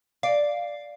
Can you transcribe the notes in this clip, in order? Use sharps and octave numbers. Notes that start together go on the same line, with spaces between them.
D5 F5